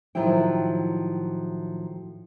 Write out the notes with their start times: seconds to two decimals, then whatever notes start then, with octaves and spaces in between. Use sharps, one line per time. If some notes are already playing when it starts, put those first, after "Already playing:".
0.15 A2 D#3 F3 F#3 E4 G5